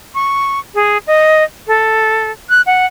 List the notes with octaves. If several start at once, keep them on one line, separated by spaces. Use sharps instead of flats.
C#6
G#4
D#5
A4
F#6
F#5